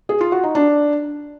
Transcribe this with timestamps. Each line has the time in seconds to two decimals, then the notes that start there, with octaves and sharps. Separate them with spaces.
0.09 G#4
0.21 F4
0.32 F#4
0.44 D#4
0.55 D4